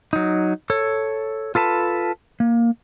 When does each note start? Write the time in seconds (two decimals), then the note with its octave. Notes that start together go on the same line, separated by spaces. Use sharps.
0.13 F#3 D#4
0.70 A4 C#5
1.55 F4 A4 B4 A5
2.40 A#3